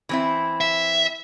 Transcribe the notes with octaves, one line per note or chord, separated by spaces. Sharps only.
E3 C4 E4
E5